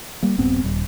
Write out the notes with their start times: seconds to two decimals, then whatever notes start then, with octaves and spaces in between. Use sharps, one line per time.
0.23 G3 A#3
0.38 D#1 G2 B3 C4
0.63 D#1 G3